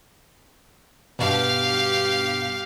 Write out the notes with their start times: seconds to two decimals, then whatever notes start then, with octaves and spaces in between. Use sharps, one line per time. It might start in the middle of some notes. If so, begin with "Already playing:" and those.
1.19 G2 B2 G4 F5